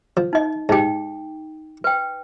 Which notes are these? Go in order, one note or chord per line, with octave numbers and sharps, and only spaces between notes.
F3
D#4 D#5
G#2 D#4 G4 G5
B4 G5